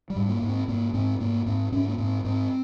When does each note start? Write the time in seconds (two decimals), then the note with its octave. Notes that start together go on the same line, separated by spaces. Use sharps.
0.10 G3
0.16 G#2
0.28 A#3
0.42 G#2
0.49 C4
0.68 G#2 A#3
0.93 G#2 C4
1.20 G#2 A#3
1.46 G#2 C4
1.72 G#2 C#4
1.88 A#3
1.98 G#2 C4
2.24 G#2 C4